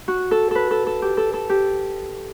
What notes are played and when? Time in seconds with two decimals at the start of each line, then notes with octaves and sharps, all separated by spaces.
0.08 F#4
0.31 A4
0.51 A4 B4
0.71 A4
0.87 A4
1.02 G4
1.17 A4
1.34 A4
1.49 G4